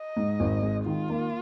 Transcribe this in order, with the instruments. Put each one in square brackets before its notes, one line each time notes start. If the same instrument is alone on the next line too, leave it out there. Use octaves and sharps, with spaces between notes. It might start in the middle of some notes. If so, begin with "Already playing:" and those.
Already playing: [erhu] D#5
[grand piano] G#2
G#1
G#3
[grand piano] D#3 [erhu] F4
[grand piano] A#3